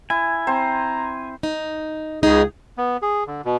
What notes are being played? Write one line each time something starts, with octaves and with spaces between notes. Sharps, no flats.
E4 G#5
C4 C5 A#5
D#4
C#2 C#3 D#4 G#4
B3
G#4
D3
B2